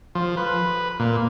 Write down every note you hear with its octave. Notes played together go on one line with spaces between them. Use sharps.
F3
B4
A#2